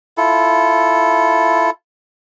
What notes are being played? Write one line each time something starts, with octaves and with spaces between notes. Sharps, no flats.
E4 F4 A4